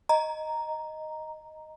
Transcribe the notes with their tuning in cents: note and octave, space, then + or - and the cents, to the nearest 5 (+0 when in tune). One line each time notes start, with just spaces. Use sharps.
D#5 +0 A#5 +0